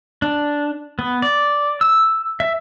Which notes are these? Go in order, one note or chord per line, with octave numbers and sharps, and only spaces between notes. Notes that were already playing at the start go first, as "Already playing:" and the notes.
D4
B3
D5
E6
E5